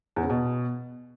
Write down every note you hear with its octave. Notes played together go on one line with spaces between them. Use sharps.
E2
C#3
B2